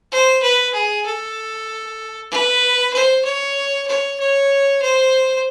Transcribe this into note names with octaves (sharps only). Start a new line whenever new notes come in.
C5
B4
G#4
A4
B4
C5
C#5
C#5
C#5
C5